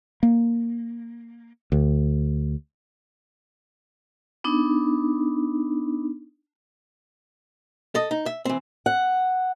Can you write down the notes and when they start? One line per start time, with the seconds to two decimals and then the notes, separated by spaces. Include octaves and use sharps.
0.23 A#3
1.72 D2
4.44 B3 D4 D#4
7.95 A4 D#5
8.11 D#4
8.26 E5
8.45 E3 C4
8.86 F#5